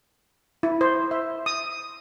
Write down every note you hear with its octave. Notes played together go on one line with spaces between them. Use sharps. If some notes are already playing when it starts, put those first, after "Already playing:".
E4
C5
E5
D#6